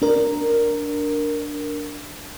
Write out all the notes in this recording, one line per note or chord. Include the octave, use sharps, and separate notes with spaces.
D4 A#4